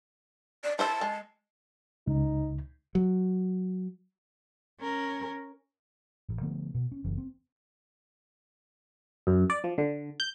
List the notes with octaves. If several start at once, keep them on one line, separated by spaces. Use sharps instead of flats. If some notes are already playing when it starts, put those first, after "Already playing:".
D5
E4 C5 E5 A5
G#3
C#2 D#4
F#3
C#4 A#4
A1
D3 F3 A3 B3
B2
C#4
F#1 E3
C4
F#2
D5
F3
D3
G6